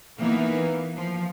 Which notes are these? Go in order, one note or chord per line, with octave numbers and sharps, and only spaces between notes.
E3 A#3 B3 D#4
F3